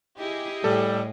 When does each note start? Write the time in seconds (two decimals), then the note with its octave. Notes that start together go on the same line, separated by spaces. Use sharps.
0.19 E4 G4 G#4 D#5
0.64 A2 G3 A4